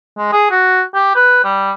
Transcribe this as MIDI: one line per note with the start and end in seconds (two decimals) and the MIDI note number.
0.18 0.28 56
0.32 0.47 68
0.51 0.82 66
0.95 1.13 67
1.16 1.40 71
1.44 1.72 55